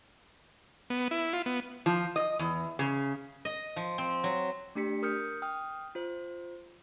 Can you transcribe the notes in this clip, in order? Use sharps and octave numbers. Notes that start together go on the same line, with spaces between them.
B3
E4
F4
B3
F3
D#5
E2
C#3
D#5
F3
C4
F#3
A3 D4 G4 B6 C#7
A#4 D#6 F6 G6 C#7
G5 D#6 F6
F4 C5